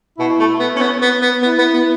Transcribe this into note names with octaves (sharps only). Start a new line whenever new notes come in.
B2 E4
A3
B3
C#4
B3
B3
B3
B3 E4
B3
B3